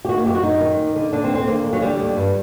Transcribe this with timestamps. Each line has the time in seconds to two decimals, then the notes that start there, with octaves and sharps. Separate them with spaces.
0.05 G4
0.09 D#3 F#4
0.17 A#3
0.26 F#2 G4
0.34 F#4
0.43 F#2 D#4
0.61 D#3
0.78 D#2
0.95 D3
1.13 D3 D4
1.24 C4
1.30 D#2
1.35 C4
1.47 D3 A#3
1.64 D#2
1.73 F#3
1.82 D3 G3
1.99 D#2
2.16 G2